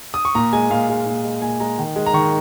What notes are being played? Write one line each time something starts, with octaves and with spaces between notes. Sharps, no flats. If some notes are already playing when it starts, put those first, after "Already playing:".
D#6
C#6
A#2 A#5
G#3 G#5
A#2 F5
G#3
A#2
G#3
A#2 G#5
G#3 A#5
D#3
G#3
A#5
D#3 C#6